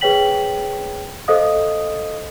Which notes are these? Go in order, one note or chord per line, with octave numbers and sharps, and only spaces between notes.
G#4 B4 C#5 G5 B6 F#7
A4 C5 D#5 F5 D#6